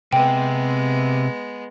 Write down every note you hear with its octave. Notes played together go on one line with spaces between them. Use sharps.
C3 G#3 B3 G5